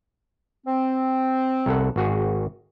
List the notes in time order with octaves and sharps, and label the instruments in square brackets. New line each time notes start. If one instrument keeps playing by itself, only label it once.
[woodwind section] C4
[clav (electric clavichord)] C2 A4 F#5
G#1 F#4 G#4